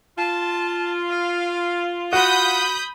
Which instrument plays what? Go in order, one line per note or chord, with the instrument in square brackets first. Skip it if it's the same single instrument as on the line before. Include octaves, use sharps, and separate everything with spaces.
[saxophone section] F4 [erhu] A5
[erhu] F5
[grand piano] F#4 [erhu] F#5 [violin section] B5 D#6 G6